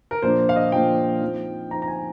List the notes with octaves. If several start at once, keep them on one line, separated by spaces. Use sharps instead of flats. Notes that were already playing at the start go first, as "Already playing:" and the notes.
A#4
A#2 F3 A#3 D4 C5
F5
D#5
A#2 F3 A#3 D4 G5
F3 C4 D#4
F3 C4 D#4 A#5
A#5
G#5